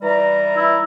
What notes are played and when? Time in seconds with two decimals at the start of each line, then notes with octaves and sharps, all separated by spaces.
0.02 E3 G3 A#5
0.57 E4